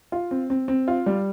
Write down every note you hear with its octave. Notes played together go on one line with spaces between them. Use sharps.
F4
C4
C4
C4
F4
G3